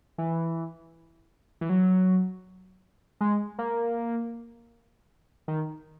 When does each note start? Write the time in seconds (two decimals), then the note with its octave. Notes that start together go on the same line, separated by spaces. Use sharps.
0.18 E3
1.61 E3
1.69 F#3
3.21 G#3
3.59 A#3
5.48 D#3